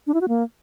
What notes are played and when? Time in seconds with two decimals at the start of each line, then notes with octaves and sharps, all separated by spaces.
0.07 D4
0.14 E4
0.21 F#4
0.28 A#3